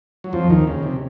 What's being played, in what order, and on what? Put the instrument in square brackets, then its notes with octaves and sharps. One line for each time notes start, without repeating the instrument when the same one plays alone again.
[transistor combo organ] F#3
F2 F3
D#2 D#3
C#3
C3